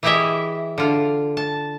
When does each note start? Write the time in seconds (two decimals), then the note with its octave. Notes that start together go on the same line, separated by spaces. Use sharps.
0.03 E3 E4 G4 G#4 D#5 E5
0.78 D3 F4
1.37 A5